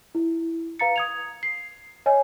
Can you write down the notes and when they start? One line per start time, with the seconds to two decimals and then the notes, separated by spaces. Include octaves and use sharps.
0.15 E4
0.79 B4 F5 A#5 A6 C#7
0.96 D#6 G#6 F7
1.43 C7
2.06 C#5 D#5 G#5